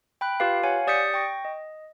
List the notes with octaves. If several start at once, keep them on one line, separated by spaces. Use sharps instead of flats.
G5 B5 F#6
F4 G4 B4 F5
C#5 F5 F#5 G#5
G4 D5 D#6 G6 B6 C#7
G5 C#6 A#6
D#5